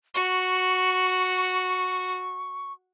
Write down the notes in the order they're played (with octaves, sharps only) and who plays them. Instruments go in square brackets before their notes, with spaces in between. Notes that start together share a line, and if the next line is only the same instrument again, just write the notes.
[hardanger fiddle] F#4 [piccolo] C#6